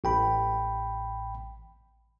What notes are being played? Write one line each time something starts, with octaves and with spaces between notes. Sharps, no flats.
A1 G5 B5